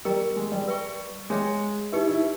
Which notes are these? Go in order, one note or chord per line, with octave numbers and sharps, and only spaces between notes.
G3 G4 A#4 D#5 G5 A#5
A#3
G#3
G3
B4 E5 G5 C#6
G#3 G#4 C#5 E5 G5
D#4 E4 G4 B4
E4